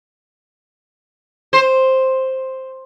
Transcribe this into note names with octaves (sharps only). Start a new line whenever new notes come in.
C5